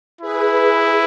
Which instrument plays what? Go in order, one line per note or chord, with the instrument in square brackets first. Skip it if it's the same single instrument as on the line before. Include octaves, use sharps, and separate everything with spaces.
[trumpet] E4 [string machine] G#4 B4